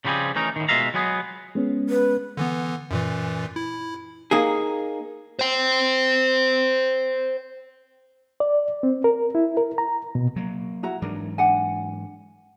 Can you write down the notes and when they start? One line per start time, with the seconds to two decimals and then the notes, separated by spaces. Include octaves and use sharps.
0.05 C#3 F3 G3 C4 G#4
0.35 E3 A3 C#4 D#4 A#4
0.56 A2 D#3
0.69 B2 G#3 F4 E5 F5 A#5
0.94 F#3 G#3 B3 G#4
1.55 G#3 B3 C#4
1.89 B4
2.37 D3 E3 B3
2.91 F#2 A#2 E3
3.56 E4
4.31 A#3 D#4 G#4
5.39 C5 G5
8.40 D5
8.83 C4
9.04 A#4
9.35 E4
9.57 A#4
9.78 A#5
10.15 B2
10.36 F#3 A#3
10.83 E4 F#4 A#5
11.02 G#2 E3 F#3 D4 A#4
11.38 D4 F#5 G#5